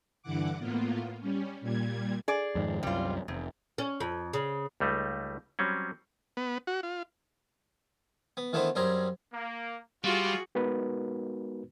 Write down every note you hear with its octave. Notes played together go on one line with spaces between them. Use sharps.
G2 D3 E3 F#5 D6
A2 A#3 B3 F4
G3 C#4
A#2 G3 G#6
G#4 D5
F2 G#2 D#3
C2 F#2 G3 F4
F1 E2
C#4
F2
C#3
C#2 G3 A3 D#4
F#3 G3 C4 C#4
B3
F#4
F4
B3
D#3 E3 A3 B3 D4 C5
F#2 G3 C4 G#4 A#5
A#3
G3 F4 F#4 G#4
G#3 B3 D#4 F#4 A#4 B4